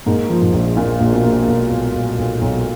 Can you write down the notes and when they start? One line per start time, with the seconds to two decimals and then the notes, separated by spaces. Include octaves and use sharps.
0.06 G#2 A#3
0.29 F3
0.41 G#2
0.53 A#1
0.77 A#2 A#3
1.00 A#1
1.12 B2
1.24 A#3
1.48 B1
1.70 B1
1.94 B1
2.18 B1
2.41 B1